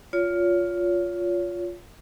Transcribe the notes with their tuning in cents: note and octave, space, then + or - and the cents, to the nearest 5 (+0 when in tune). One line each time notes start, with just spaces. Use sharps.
F4 +5 C#5 +35